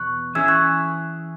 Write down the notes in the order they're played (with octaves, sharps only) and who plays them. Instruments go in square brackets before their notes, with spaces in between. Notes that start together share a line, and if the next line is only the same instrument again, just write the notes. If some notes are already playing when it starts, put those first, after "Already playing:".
Already playing: [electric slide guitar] E2 B2 [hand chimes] C#6 F#6
[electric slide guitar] E3 C#4 G#4 E5 [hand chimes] E6 G#6
[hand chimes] C#6 F#6